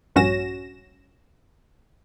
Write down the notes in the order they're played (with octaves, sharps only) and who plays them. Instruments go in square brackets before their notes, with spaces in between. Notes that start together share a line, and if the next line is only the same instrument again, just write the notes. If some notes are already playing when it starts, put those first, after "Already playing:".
[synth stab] A#1 G2 C#4 F#4 A#6 E7